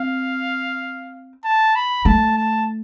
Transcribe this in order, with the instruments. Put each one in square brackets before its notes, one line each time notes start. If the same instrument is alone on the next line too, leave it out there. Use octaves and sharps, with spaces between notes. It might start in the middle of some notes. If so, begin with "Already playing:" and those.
Already playing: [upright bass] C4 [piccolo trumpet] F5
[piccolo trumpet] A5
B5
[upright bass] A3 [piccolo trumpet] A5
[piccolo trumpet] A5